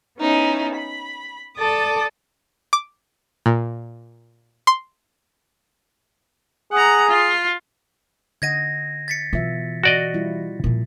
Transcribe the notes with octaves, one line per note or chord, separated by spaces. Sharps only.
B3 C#4 D#4 E4
B5
A4 D5 A5 D6 D#6
D6
A#2
C6
G#4 F#5 A#5
F4
D3 D#5 F#5 G#6 A#6 D#7
A6 B6 C#7
B2 E3 F4 E5
F#4 D5 D#5
G3 E4 F4
A#2 F3